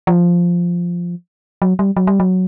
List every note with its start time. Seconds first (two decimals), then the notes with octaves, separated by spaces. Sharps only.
0.07 F3
1.62 F#3
1.79 G3
1.97 F#3
2.07 G3
2.20 F#3